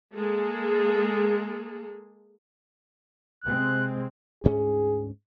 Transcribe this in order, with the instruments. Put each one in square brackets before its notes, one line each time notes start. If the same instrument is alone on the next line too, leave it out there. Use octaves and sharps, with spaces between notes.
[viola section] G#3 A#3 G#4 A4
[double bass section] C3 G#3 C4 [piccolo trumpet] F#6
[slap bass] D2 G#2 C#4 [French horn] G#4